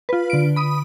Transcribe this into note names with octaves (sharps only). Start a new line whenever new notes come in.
F4 B4
D3 D7
B5 D#6